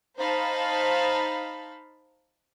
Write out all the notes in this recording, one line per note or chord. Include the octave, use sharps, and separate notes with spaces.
D#4 C5 F5 A5 B5